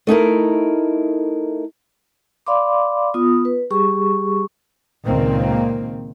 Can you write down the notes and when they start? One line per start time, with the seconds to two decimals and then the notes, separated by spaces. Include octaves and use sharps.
0.07 A3 D#4 E4 A#4
2.46 D5 F5 B5 C6 D6
3.14 B3 F4 D#6
3.45 B4
3.70 G3 G4 G#4 C#6
5.05 C#2 A#2 D#3 A#3 C4